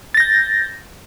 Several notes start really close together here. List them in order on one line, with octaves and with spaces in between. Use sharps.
A6 A#6 G6